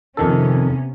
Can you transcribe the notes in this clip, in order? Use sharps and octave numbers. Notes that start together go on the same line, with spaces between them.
F2 C3 D#3 B3 C#4 A4